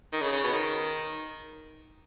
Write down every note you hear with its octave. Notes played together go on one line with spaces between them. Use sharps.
D#3
C#3
C#3
B2
D#3